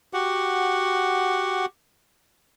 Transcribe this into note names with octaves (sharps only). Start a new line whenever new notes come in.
F#4 G4 F#5